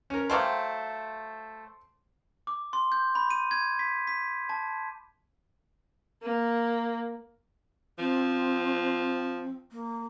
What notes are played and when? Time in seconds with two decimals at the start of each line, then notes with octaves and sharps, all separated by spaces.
0.10 C#4 A#4
0.30 F#3 A3 C5 F5 G5 D6
2.47 D6
2.73 C6
2.92 G6
3.15 B5
3.30 D#7
3.51 G#6
3.79 B6
4.07 B6
4.49 A5
6.23 A#3
7.99 F3 C4
9.72 A#3